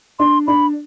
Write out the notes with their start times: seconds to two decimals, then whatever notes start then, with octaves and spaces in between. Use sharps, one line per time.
0.19 D4 C6
0.47 D4 B5